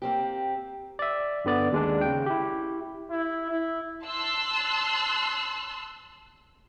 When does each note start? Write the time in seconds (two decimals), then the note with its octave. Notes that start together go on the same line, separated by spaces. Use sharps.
0.02 A#3 C4 G4
0.99 D5 E5
1.45 G1 D3 B3 D5
1.72 D#2 G#3 D4
2.01 C#3 G5
2.26 E4 G4
3.10 E4
3.51 E4
4.03 A5 C6 E6 F#6